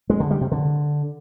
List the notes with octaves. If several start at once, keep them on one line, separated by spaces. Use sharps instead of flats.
G#3
D3
G3
C3
D3